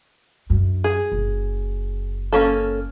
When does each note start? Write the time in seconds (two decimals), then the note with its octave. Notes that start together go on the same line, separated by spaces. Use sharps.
0.50 F#2 D4
0.84 G#4
1.12 F#1
2.32 A#3 C#4 A4